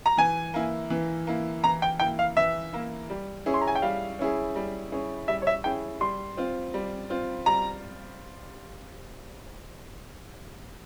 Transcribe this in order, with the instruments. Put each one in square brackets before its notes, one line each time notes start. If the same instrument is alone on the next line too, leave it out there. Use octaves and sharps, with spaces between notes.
[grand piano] A#5
[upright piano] E3 [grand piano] G#5
[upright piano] A#3 E4
E3
A#3 E4
[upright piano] E3 [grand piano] A#5
[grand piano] G5
[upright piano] A#3 E4 [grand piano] G5
[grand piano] F5
[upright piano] E3 [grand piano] E5
[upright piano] A#3 E4
G3
C#4 E4 G#4
[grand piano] C6
A#5
G#5
G5
[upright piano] G3 [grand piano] F5
[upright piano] C#4 E4 G#4
G3
C#4 E4 G#4
[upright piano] G3 [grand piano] E5
[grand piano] C#5
E5
[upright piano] C#4 E4 G#4 [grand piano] G5
[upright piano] G3 [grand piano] C6
[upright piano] C4 F4
G3
C4 F4
[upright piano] G3 [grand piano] A#5